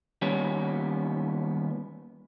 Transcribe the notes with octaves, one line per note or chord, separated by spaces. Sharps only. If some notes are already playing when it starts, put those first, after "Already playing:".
D#2 G3 B3 C#4